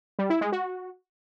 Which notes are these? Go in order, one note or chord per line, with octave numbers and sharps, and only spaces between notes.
G3
E4
G#3
F#4